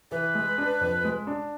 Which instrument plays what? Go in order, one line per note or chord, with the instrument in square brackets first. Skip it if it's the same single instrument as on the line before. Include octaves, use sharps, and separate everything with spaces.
[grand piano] E3 [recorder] B4
[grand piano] G#3
D4
F2
G#3
D4